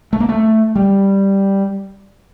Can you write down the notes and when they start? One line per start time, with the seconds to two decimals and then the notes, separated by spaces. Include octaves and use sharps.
0.13 A3
0.20 A#3
0.29 A3
0.75 G3